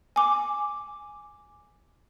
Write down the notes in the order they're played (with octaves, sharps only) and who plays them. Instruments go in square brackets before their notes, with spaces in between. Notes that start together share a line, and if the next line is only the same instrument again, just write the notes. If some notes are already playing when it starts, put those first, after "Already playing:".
[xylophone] G#5 D6